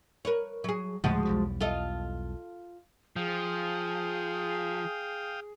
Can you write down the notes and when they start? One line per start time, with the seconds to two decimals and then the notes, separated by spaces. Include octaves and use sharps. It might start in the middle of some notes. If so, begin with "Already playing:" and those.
0.25 A#4 B4 C#5
0.64 F#3 G#4
1.04 D2 A2 C#3 F3 G#3 F#4
1.25 B1 E2 G3
1.60 F4 A4 D#5
3.16 F3 G#4 F5 G5 D#6